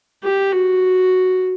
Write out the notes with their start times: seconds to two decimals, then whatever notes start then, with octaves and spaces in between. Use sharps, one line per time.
0.24 G4
0.52 F#4